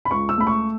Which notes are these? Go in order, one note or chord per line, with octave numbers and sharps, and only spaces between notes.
B5
C#2 C#6
E6
A3 B5
C#6